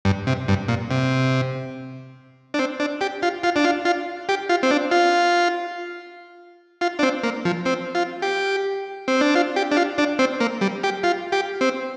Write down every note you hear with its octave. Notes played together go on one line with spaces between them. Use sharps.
G2
C3
G2
A#2
C3
D4
C4
D4
G4
F4
F4
D4
F4
F4
G4
F4
C4
D4
F4
F4
D4
C4
A#3
F3
C4
F4
G4
C4
D4
F4
G4
D4
F4
D4
C4
A#3
G3
G4
F4
G4
C4